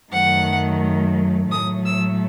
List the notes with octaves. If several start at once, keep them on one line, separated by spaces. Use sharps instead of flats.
F#2 D#3 F#3 A3 F#5
A2 F#3 A3 D#6
E6